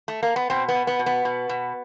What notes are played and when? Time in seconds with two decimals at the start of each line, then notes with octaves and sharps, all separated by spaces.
0.08 A3
0.23 A#3
0.36 B3
0.50 B2 C4
0.69 B3
0.75 B2
0.87 B3
0.99 B2
1.06 B3
1.25 B2
1.49 B2